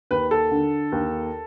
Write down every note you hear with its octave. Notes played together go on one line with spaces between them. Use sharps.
D#2 B4
A4
D3
D#2